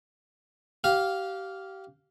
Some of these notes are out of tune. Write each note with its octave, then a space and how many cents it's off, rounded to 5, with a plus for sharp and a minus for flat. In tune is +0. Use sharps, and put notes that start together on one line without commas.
G4 -25 F5 +0